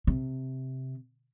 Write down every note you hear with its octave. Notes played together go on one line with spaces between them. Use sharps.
C3